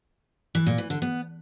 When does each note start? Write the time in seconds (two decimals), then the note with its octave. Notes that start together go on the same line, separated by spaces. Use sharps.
0.55 E3
0.66 A#2
0.78 E3
0.90 D3
1.02 B3